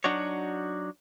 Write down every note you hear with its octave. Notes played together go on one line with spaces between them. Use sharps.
F#3 D4 D#4 F#4 C#5